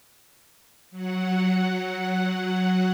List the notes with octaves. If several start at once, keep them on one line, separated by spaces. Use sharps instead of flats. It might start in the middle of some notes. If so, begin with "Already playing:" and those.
F#3 F#5